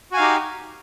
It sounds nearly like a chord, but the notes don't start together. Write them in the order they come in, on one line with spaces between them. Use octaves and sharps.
F#4 G#5 F5 D#4 G4